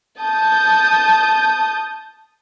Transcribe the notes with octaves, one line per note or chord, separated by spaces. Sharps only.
A5 D#6 G6